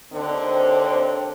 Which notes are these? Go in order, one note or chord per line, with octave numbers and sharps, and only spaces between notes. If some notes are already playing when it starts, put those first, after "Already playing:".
D#2 D3 C4